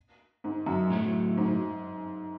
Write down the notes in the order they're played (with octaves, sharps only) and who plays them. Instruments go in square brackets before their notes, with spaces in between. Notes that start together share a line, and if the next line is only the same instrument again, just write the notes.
[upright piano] G#2
F#2
[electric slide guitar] A2 F#3 A3
[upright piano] G#2